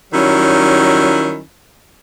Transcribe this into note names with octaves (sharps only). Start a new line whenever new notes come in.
D#3 F#3 G3 C#4 E4